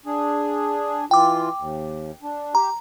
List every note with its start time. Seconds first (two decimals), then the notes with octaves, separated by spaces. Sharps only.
0.06 D4 G#4
1.11 E3 F4 G5 D6
1.59 D#2
2.23 D4
2.55 G4 A#5